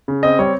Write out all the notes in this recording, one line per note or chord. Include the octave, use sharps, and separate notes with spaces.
C#3
C4 D#5
G3 C#5